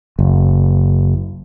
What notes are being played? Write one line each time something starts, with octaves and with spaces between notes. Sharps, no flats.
F#1